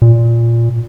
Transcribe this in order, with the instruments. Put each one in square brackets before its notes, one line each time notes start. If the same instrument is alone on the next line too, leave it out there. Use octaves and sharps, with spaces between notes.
[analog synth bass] A#2